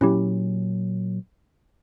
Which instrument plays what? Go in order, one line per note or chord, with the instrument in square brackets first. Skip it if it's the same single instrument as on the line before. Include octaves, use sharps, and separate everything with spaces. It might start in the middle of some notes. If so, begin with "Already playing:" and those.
[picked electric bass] A#2 F#3 [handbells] C#4 E4 G4